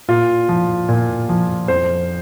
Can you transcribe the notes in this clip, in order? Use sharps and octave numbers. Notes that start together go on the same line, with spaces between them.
A#2 F4
F3
A#2
F3
F2 C5